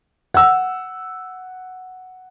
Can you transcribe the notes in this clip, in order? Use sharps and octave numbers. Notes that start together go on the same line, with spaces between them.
F#5 E6